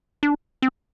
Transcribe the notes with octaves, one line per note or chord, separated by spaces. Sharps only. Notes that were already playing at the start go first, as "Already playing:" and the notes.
D4
C4